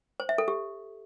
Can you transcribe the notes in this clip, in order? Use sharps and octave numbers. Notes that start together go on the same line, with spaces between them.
C5
E5
A4
G4